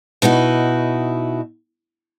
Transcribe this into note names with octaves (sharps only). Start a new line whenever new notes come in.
B2 D#4 E4 F#4